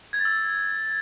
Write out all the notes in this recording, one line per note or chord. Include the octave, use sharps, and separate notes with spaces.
G#6
A6
E6